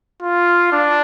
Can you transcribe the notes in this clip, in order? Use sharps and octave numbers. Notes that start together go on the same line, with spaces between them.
F4
D4